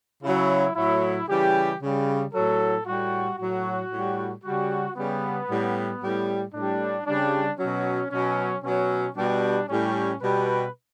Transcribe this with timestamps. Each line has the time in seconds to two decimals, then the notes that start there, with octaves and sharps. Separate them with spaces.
0.23 C#3 F#3 E4
0.76 A2 F#3 E4
1.29 C#3 E3 G3 G4
1.82 C#3 G3
2.34 A2 F#3 A4
2.86 A2 G3 F#4
3.38 A2 F#3 F#4
3.91 A2 G3
4.44 C#3 G3 F#4
4.96 C#3 G3 B3
5.49 A2 G3
6.02 A2 G3
6.54 A2 G3 D4
7.07 C#3 G3 D4
7.59 B2 F#3 C#4
8.11 B2 F#3 C#4
8.64 B2 F#3 C#4
9.17 B2 G3 D4
9.69 A2 G3 C#4
10.22 B2 G3 B4